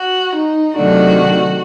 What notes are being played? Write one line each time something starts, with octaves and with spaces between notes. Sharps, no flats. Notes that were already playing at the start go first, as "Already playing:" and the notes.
Already playing: F#4
D#4
C3 D#3 F#3 A3 D4 F#4